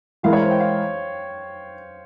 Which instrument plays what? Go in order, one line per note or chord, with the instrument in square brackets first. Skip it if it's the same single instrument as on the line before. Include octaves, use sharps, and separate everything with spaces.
[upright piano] E3 G#3 E4 A#4 [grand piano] F5
[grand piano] C#5
C5
G5
F5